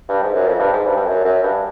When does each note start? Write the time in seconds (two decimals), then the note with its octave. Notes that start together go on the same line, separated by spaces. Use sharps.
0.09 G2
0.22 G#2
0.34 F#2
0.48 F2
0.60 G2
0.73 G#2
0.86 G2
0.97 G2
1.06 F#2
1.25 F#2
1.43 G2